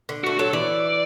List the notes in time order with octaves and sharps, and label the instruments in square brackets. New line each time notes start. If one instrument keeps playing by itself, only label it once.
[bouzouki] D3
[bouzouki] A3 [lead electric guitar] F#4
[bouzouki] F#3 [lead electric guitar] A4
[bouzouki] E3 [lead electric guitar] D5